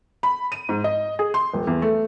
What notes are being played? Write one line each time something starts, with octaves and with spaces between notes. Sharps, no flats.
B5
D#7
G#2
D#5
G#4
C6
D#1
E2
A3